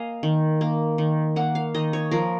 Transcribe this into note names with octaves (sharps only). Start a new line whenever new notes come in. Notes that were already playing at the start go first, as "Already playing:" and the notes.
Already playing: A#3 D#5 F5 G#5
D#3
A#3
D#3
A#3 F#5
F5
D#3 D#5
C#5
F3 A#4